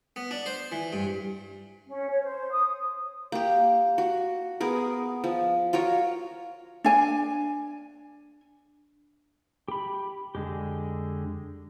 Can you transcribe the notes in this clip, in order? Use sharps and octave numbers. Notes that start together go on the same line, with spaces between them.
B3
D4
C5
E3
G2
C#4
C#5
C5
D#6
A#3 G4
F#4
B3 G#4 A#4
F3
F4 F#4 A#4 C#5
D4 G#5
G4 B5
F2 D3 G#3 G4